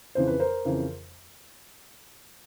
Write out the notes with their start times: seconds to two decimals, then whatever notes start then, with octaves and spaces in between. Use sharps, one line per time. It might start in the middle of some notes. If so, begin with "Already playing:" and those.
0.15 F2 C#3 E3 C5
0.27 B4
0.40 A#4 C5
0.65 F2 C#3 E3